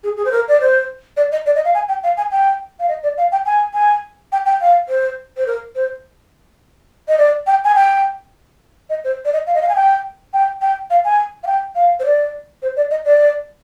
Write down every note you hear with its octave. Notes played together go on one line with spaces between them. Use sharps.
G#4
G#4
C5
A#4
D5
C5
D5
D#5
D5
D#5
F5
G#5
G5
F5
G#5
G5
F5
D#5
D5
F5
G5
G#5
G#5
G5
G5
F5
C5
C5
A#4
C5
D#5
D5
G5
G#5
G5
D#5
C5
D5
D#5
F5
D#5
F5
G#5
G5
G5
G5
F5
G#5
F5
G5
F5
C5
D5
C5
D5
D#5
D5